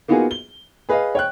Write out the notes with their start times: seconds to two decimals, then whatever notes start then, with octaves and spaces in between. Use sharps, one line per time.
0.08 A#3 B3 D#4 F4 F#4 G#4
0.31 G7
0.89 G#4 B4 D#5 F5
1.15 C#5 G5 F#6